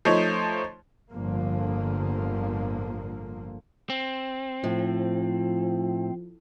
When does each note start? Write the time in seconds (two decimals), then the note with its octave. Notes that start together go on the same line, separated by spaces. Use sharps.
0.05 F3 A3 D#4 C5 C#5
1.12 G1 A2 D3 F3 A#3
3.90 C4
4.64 A2 F3